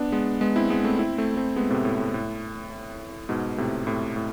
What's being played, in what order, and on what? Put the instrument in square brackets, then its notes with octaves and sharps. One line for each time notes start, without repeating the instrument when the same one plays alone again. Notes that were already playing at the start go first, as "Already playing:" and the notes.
Already playing: [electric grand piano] B3 D4
G#3 B3
G#3 B3
C4 E4
G#3 B3
A3 C4
C4 E4
A3 C4
A3 C4
G#3 B3
A2 C3
A2
A2
A2
G#2 B2
A2 C3
A2 C3
A2